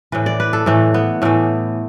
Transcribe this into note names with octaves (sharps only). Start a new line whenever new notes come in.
A2 E3 B4
D5
B4
A4
A2 E3 A3
B3
A2 E3 A3